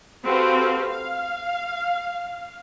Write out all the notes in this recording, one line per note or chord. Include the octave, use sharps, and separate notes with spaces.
C4 F#4 G4 A4 B4 F5
F5